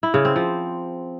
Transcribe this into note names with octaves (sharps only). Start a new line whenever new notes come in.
E4
C#3
C4
F3